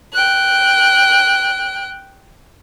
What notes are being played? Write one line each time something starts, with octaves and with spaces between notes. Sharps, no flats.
G5 F#6